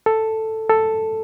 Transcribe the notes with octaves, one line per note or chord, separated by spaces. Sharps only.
A4
A4